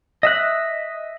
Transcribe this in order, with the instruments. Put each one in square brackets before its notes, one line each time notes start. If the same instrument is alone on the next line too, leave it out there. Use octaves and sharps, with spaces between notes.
[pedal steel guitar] D#5 E5 F#6